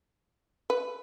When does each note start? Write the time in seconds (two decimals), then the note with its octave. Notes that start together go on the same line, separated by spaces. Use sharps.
0.70 B4